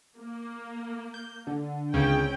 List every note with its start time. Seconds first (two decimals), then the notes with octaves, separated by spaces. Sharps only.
0.19 A#3
1.14 G6
1.47 D3
1.94 C#2 C#3 C4 C#4 G5